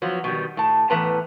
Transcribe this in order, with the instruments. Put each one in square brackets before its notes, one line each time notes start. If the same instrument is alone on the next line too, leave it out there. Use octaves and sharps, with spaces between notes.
[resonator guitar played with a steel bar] F3 F#3 B3
B2 D#3 G3
A2 A5
A2 E3 B3 B4 A5 A#5